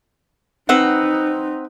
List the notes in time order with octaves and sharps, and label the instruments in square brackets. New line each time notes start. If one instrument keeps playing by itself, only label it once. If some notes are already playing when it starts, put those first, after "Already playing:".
[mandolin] C4 B4 F#5 [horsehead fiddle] D#4